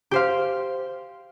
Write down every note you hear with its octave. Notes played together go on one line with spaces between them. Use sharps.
G4 C5 F5